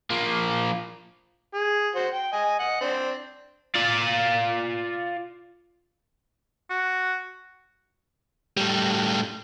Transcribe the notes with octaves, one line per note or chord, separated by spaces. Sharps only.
F3 A#3
G#4
F#4 C5
G5
D#5 G#5
D#5 F#5
C4 D4
F4 D5
F#4
A2 G3